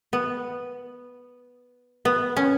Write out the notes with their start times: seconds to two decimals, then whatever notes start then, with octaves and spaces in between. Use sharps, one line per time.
0.13 B3
2.05 B3
2.37 C#4